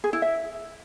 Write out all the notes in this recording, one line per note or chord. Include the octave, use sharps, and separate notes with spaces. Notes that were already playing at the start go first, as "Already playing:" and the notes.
G#4
E4
E5